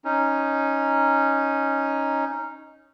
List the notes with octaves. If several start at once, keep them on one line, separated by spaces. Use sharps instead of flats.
C#4 D#4